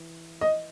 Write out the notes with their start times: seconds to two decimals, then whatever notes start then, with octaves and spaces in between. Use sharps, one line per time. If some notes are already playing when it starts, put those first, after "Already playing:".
Already playing: E3
0.41 D#5